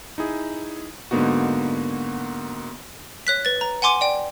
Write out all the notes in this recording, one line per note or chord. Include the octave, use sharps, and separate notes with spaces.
D#4 E4 G#4
G#2 D3 A#3 B3 D#4 F#4
C#5 F#6 B6
B4 A6
A#5
F#5 G#5 C6 D6 D#7
D5 G5